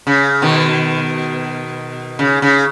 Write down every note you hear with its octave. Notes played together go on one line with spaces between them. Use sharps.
C#3
B2 D#3
C#3
C#3